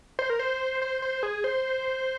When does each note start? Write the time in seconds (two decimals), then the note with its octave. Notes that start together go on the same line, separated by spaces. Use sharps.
0.19 C5
0.30 A#4
0.39 C5
0.82 C5
1.02 C5
1.23 G#4
1.44 C5